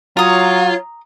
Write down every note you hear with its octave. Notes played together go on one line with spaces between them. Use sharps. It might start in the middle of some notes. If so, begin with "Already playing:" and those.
F#3 F4 C#5 A#5 D#6